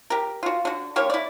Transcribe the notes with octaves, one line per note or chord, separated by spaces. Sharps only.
G4 A#4
F4 F#4
D3 F#4
D3 A#3 G4 C#5
E4 D5